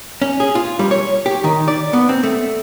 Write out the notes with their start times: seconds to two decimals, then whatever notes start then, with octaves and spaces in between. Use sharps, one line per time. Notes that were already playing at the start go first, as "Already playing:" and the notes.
0.22 C#4
0.40 G#4
0.55 F4
0.79 G3
0.91 C#5
1.26 G4
1.44 D#3
1.68 D5
1.93 B3
2.09 C4
2.23 A3